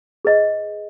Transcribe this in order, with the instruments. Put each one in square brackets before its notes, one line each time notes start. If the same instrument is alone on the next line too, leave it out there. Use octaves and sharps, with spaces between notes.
[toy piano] G#4 B4 D#5